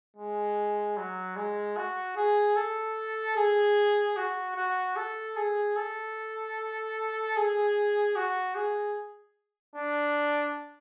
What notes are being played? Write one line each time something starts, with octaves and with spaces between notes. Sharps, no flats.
G#3
F#3
G#3
F#4
G#4
A4
G#4
F#4
F#4
A4
G#4
A4
G#4
F#4
G#4
D4